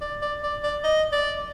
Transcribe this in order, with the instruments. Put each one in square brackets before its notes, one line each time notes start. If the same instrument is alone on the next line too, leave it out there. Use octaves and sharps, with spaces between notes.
[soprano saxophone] D5
D5
D5
D5
D#5
D5